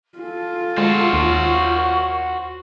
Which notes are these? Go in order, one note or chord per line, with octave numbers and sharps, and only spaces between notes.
F4 A4 G#5
G#3 F#4 C5
D#2 A#4 C#5 C#6